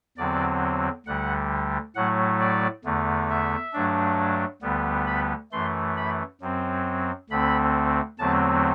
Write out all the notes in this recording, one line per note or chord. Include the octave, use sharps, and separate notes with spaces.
E2 D3 F#3 C4 D5
D2 D3 G3 F#5
A2 F#3 A3 F#5
D5
E2 D3 A3
E5
G2 F#3 A3 D4
D2 D3 G3 B3
B5
F#2 E3 A3 C6
B5
F#2 F#3 C4
D2 D3 A3 C4 B5
E2 D3 F#3 A3 C4 A5